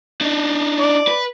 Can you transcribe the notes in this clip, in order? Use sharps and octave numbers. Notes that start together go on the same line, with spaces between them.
D4 D#4
D5
B4